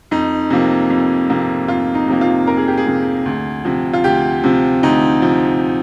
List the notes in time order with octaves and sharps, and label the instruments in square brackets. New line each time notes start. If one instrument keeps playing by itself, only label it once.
[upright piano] F2 D#4
C3 F3 A#3
F2
C3 F3 A#3
F2 F4
D#4
C3 F3 A#3
F4
F2 A#4
G#4
G4
G#4
C3 F3 A#3
D2
C3 F3
F4
D2 G4
C3 F3
D2 D#4
C3 F3